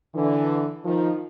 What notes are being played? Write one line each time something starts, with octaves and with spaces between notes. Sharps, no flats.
D3 E3
D#3 F3